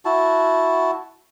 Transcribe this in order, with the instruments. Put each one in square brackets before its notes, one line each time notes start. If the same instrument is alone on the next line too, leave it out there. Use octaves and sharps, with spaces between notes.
[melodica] E4 F#4 A5